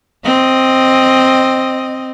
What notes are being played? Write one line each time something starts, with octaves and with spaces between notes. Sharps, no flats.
C4 D#5